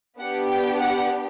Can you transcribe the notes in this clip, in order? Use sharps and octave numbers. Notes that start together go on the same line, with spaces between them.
B3 D4 G4 F#5
G5
F#5